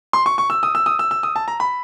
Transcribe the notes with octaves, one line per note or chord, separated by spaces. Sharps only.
C6
C#6
C#6
E6
D#6
E6
D#6
E6
E6
D#6
A5
A#5
B5